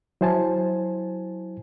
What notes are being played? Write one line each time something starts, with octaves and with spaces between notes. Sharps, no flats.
F#3 E4 C5 G#5 A5